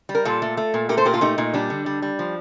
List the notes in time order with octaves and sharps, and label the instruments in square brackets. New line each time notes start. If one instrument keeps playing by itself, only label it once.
[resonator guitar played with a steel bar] G3
A#4
A#2 F4 A4
A3
A3
A#2
A3 G4 A#4
A4 C5
A#2 G4 A#4
F4 A4
A3 D#4 G4
A#2 D#4
G3 D4
D3
G3
G3
F3